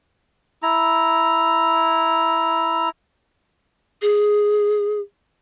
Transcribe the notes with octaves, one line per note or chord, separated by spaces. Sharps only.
E4 A#5
G#4